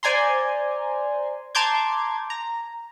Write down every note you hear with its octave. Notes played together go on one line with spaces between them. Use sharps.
C5 D5 G#5 A#5 C6
A5 A#5 C6 D6 G6 G#6
A#5